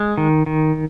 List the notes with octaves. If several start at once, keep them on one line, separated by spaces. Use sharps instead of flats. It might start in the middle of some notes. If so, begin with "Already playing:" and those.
Already playing: G#3
D#3
D#3